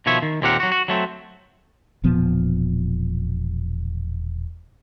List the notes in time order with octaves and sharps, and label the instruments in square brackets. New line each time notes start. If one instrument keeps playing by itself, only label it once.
[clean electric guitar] B2 D#3 F3 C#5 E5
D#3
D#2 A#2 C4 G4 A#4 F#5
F#3 F#4
F#4
F#3 A3 C4
[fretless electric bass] E1 A#2 F3 B3